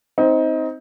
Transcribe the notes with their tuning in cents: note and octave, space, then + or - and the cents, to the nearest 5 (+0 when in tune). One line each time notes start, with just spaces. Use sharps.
C4 +0 D#4 +25